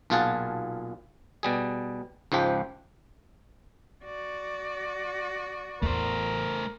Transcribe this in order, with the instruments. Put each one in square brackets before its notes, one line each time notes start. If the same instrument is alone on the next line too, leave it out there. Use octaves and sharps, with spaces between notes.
[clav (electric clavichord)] B1 A#2 F4 G#4 F#5 A5
B2 G3 G#4
C#2 G#2 F3 G4
[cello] F#4 D5
[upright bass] A1 E2 [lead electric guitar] A3 C5 [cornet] A#4